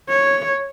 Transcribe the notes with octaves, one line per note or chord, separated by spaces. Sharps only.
C#5